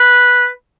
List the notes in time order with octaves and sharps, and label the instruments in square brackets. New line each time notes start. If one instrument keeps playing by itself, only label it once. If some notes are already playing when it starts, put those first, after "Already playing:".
Already playing: [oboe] B4